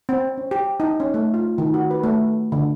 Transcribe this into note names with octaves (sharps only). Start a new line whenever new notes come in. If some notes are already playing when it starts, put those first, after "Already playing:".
C4
C#4
G4
D#4
C#4
A3
F4
D#3
F#4
B4
A3
D3